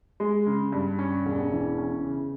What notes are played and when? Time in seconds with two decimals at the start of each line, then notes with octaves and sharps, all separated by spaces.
0.20 G#3
0.47 C#3
0.72 G2
0.99 C#4
1.26 E1
1.52 E3
1.78 C#4
2.04 C#3